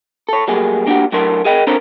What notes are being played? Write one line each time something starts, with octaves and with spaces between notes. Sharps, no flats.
A4 C#5
F#3 G3 A3 A#3 G#4
A#3 D4 D#4 F#4 G4
A2 F#3 A3 D4 A#4 C6
G#4 A#4 D#5 G5
C4 D4 A4 A#4 C5 C#5